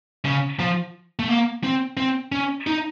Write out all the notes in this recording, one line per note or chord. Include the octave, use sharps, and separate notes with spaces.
C#3
F3
A3
A#3
C4
C4
C#4
D#4